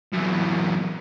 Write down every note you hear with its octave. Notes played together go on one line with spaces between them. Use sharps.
F#2 E3